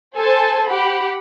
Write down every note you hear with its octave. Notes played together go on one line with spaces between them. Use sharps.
A4 C5 G#5 A5
G4 F#5 B5